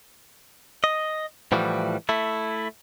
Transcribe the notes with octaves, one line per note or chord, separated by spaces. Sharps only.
D#5
A2 E3 F3 G3 F#4
A3 E4